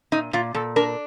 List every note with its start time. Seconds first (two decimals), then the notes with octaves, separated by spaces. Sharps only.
0.12 A#2 D#4
0.33 A#2 F4
0.54 A#2 A4
0.76 D4 A#4